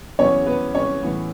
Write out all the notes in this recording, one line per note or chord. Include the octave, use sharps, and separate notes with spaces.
E2 C#3 F#3 B3 C#4 C#5
B3 B4
C#4 C#5
A2 E3 B3